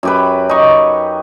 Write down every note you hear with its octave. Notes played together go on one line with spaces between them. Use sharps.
F#2 G4 B4
D#4 C#6